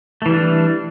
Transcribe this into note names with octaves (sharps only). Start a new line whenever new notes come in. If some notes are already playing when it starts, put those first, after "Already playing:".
E3 G3 A3 D4